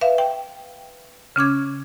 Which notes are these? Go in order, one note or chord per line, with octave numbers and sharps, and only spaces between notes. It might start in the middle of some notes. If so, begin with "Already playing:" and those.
B4 E5 F5
G5
C#3 C#4 D6 G#6